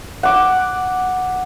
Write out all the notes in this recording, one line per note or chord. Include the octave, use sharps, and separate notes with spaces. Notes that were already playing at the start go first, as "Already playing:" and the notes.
F#5 D6